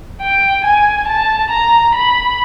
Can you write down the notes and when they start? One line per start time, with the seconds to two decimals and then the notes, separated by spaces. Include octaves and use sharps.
0.21 G5
0.65 G#5
1.08 A5
1.51 A#5
1.95 B5